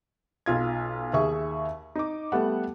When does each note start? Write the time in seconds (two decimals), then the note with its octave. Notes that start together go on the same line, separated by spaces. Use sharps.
0.46 B1 F4 G#6
1.14 D#2 G#4 E5 C#6
1.95 D#4 D6
2.32 G3 A3 B3 F#5